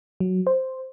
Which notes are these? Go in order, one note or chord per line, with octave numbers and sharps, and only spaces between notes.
F#3
C5